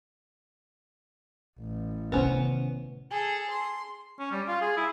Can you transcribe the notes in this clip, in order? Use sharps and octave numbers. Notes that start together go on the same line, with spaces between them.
A1
C3 D#3 B3 C#4 C5
G#4 A4
C6
C#4
G3
F4
G#4
E4